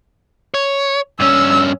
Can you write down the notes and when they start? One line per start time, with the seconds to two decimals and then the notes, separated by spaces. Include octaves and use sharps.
0.54 C#5
1.20 G2 C#4 E6